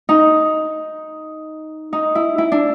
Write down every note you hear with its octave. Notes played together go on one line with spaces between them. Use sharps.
D#4
D#4
E4
E4
D4